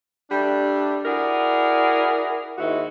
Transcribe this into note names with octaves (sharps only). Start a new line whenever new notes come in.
G3 A3 D4
E4 F#4 G#4 A#4 D5
D#2 G#2 D#3 E4 F#4